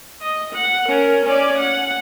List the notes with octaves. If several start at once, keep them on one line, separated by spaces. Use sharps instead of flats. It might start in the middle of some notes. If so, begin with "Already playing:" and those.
D#5
F#5
C#4 A#4
C#4 D5
F#5